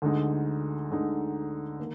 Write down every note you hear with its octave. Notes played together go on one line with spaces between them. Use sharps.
D2 D3 G#3 D#4
D2 D3 G#3 D#4
D#3 A#3